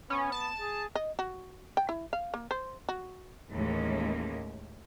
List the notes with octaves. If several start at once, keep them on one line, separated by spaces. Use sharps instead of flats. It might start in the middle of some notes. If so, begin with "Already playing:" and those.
B3 C#4
A5
G#4
D#5
F#4
G5
E4
F5
A#3
C5
F#4
D#2 A2 E3 G#3 A#3 C#4